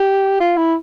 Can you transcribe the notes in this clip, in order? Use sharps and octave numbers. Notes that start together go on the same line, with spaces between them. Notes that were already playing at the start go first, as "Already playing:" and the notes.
Already playing: G4
F4
E4